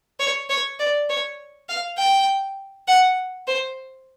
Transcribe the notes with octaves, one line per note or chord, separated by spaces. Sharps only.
C#5
C#5
D5
C#5
F5
G5
F#5
C5